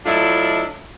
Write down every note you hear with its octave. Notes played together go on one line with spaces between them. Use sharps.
F#3 A3 D4 E4 F4 D#5